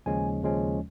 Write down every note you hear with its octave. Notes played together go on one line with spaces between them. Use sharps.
D#2 C#3 F3 G#3 C#4 G#5
D#2 C#3 F3 G#3 C#4